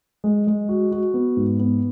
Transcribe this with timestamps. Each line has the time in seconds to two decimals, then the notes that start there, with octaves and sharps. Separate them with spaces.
0.24 G#3
0.47 G#3
0.69 F#4
0.92 F#4
1.14 B3
1.37 G#2
1.59 B3